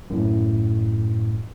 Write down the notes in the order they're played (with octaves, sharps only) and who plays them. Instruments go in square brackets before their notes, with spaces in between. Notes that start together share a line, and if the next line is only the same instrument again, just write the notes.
[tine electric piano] F#2 A2